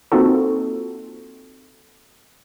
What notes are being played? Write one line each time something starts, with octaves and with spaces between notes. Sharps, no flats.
A#3 C4 D#4 F4 F#4 A4